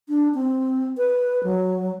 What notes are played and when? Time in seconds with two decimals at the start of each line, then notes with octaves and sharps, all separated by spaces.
0.09 D4
0.34 C4
0.98 B4
1.44 F#3